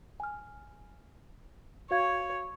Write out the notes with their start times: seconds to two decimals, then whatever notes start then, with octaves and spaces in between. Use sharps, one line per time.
0.20 G#5 F6
1.91 F#4 C#5 F5 G#6